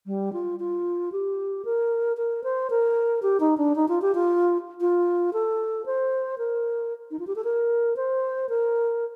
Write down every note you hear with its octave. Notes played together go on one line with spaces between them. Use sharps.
G3
F4
F4
G4
A#4
A#4
C5
A#4
G4
D#4
D4
D#4
F4
G4
F4
F4
A4
C5
A#4
D#4
F4
G4
A4
A#4
C5
A#4